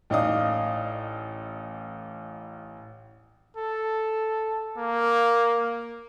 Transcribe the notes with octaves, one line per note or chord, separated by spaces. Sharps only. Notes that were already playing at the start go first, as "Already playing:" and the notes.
A1 D#4 D5 F5 D#6
A4
A#3